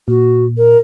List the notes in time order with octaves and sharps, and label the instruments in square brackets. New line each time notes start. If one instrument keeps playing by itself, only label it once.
[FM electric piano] A#2 [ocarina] F#4
[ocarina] A#4